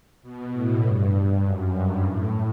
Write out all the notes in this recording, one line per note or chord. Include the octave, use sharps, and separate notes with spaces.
B2
A2
G2
F#2
G2
A2